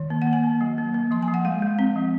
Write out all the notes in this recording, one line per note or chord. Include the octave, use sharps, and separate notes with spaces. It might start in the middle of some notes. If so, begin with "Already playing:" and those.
Already playing: D#3
A#3
F#5
A#3
G#5
A#3
F#3
A#3
A#3
F3 C6
G#5
F3
F#5
G#3 F5
G#3
C4
F3